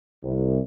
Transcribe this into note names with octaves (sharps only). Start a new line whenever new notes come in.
C2